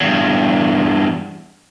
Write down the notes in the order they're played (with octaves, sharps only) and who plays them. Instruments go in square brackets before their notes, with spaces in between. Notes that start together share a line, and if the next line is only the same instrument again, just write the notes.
[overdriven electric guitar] E2 G2